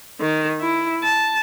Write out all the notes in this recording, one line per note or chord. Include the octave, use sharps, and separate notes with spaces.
D#3
E4
A5